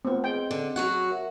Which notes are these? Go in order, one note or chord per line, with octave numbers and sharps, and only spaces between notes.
A3 B3 C4 F4
C4 G#4 D#5 G5
D3
F#3 F#4 F#5
A#4 E5 F#5